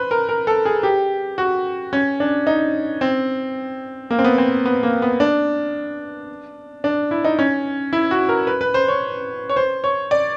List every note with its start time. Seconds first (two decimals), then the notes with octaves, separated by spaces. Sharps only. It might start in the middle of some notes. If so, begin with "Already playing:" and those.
Already playing: B4 C5
0.11 A#4
0.29 A#4
0.47 A4
0.65 G#4
0.83 G4
1.38 F#4
1.93 C#4
2.20 D4
2.47 D#4
3.01 C4
4.11 A#3
4.18 C4
4.24 B3
4.38 C4
4.65 B3
4.83 A#3
5.02 B3
5.20 D4
6.84 D4
7.11 E4
7.24 D#4
7.39 C#4
7.93 E4
8.11 F#4
8.29 A#4
8.47 B4
8.61 B4
8.74 C5
8.88 C#5
9.50 C#5
9.56 C5
9.84 C#5
10.11 D5